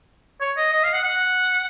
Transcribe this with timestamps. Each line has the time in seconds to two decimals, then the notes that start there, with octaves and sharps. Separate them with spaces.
0.41 C#5
0.57 D#5
0.73 D#5
0.83 F5
0.94 F#5
1.04 F#5